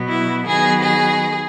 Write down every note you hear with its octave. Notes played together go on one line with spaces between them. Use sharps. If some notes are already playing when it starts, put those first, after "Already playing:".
Already playing: B2 F#3 B3
E4
D#3 F#3 B3 G#4
G#4